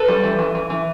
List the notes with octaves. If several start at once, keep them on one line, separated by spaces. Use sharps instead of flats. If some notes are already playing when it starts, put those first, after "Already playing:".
Already playing: A4 B4
G3
E3
E3
E3
E3